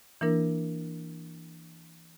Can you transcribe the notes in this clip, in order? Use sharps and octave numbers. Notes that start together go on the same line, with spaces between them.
E3 A#3 D4 E4 A#4